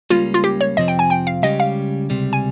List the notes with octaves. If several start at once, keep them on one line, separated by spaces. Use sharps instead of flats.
C#2 C#3 G3 A#3 C#4 F4
F4
G4
C#5
F2 C3 F3 C4 D#5
G5
G#5
G5
F5
C#2 C#3 G3 C#4 G4 D#5
F5
C#2 C3 G3
G#5